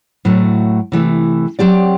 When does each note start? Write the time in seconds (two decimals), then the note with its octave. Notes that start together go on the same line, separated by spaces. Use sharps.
0.25 A2 F#3 A3
0.92 C3 E3 A3
1.59 F#3 C4 G4 D5